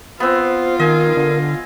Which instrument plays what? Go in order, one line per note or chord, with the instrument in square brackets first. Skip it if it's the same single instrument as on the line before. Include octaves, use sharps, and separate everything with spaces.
[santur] B3 C4 [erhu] F4 [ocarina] C5
[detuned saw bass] D#3 [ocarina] A#4 [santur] D#5 G#5
[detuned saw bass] D3